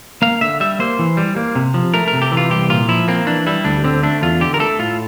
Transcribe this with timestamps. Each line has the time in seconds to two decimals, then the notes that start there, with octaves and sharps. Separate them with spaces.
0.22 A#3 F5
0.41 D3 E5
0.60 G3 E5
0.79 A#3 C5
0.99 E3
1.17 G3
1.36 A#3
1.55 C3
1.74 F3
1.94 A3 A#4
2.08 A#4
2.13 C3
2.22 G4
2.32 E3
2.37 F4
2.50 C2 G4
2.70 A#2 F4
2.89 F3 E4
3.08 A#3 C4
3.26 E3 D4
3.46 G3 E4
3.64 D2 D4
3.84 D3 C4
4.03 A3 D4
4.23 E2 F4
4.41 D3 G4
4.54 A#4
4.60 A3 A4
4.79 A2 F4